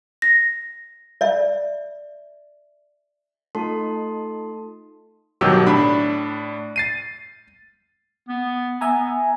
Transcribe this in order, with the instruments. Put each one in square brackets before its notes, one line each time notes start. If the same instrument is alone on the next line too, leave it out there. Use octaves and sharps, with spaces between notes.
[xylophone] A#6
[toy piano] D5 E5
[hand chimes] A3 D#4 F4 A4 A5 C6
[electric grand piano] G1 B2 D#3 F#3 G4 E6
A2 D4 B5
A6 C7 D#7
[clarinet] B3
[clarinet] B3 [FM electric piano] E5 G#5 A#5